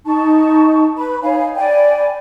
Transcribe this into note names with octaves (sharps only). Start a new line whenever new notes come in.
D#4 A5 C#6
B4 B5
D#4 C#5 F5 G#5
D5 G5 G#5 B5